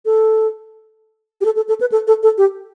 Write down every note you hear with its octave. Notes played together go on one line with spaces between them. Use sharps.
A4
G4
A4
A4
A4
B4
A4
A4
A4
G4